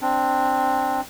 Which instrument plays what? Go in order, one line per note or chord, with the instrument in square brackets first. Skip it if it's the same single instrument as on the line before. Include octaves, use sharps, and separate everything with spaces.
[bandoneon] C4 D4